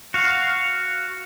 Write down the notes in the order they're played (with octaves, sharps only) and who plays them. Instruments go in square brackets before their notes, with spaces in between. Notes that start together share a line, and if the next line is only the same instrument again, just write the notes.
[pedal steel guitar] F#4 F5